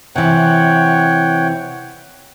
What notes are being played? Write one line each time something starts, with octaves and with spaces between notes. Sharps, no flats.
C3 E3 C#5 F#5 G5